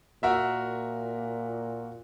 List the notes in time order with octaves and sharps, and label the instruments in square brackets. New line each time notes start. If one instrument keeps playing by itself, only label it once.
[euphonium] A#2 [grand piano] F#4 A#4 E5